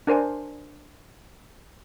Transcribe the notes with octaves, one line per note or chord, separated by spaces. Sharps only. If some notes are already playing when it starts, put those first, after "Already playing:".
D4 A#4 C5 G#5